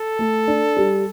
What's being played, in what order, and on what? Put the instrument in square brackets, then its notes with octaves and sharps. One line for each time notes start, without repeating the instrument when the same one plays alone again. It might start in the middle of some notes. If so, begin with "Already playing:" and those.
Already playing: [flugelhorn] A4
[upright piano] A3
D4
G3